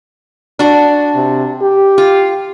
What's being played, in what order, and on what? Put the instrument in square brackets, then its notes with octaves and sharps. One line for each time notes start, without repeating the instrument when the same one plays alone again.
[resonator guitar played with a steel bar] D4 F#4
[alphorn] C3
G4
[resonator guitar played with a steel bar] F4